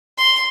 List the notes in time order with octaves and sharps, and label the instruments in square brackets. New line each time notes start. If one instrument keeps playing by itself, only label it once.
[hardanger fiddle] C6